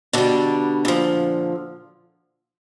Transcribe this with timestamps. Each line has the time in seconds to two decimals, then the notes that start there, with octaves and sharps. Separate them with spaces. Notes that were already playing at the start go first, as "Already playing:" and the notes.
0.13 B2 D3 G3 D4
0.85 A#2 F3